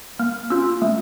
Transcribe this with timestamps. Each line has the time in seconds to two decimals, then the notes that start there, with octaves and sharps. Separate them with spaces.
0.19 A#3 F6
0.50 C#4 F4 E6
0.82 A3